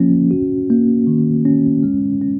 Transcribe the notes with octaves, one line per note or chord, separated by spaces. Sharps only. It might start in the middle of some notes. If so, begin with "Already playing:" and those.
Already playing: F3 A#3 C#4 F4
F#4
A#3
D#3
C#4
G#3
C#4